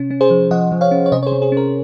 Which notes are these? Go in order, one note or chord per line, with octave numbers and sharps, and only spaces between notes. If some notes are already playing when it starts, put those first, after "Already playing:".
Already playing: C3 C#4
C#4
G#4 C5
F3
F3 D#5 F#5
F3
C#5 F5
C#4
C#5
C3 C5 D#5
C#5
G#4 C5
C3
G#4
C#4 A#4